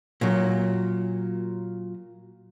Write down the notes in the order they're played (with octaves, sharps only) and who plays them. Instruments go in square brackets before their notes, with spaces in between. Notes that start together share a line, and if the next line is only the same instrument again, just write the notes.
[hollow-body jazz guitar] A#2 F#3